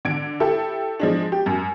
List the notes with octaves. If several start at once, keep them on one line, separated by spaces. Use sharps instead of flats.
D3 G#6 D7
E4 G4 A4
F3 G#3 D4
G4
F#2